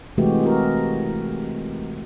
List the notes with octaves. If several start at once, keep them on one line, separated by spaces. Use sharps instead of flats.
C3 E3 G#3 A3 F#4 G4
F#4 A#4